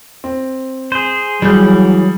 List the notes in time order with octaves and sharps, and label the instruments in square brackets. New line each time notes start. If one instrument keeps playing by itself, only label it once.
[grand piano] C4
[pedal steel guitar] G#4 C5
[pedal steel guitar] E3 G6 [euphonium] F#3 [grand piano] G3 G#4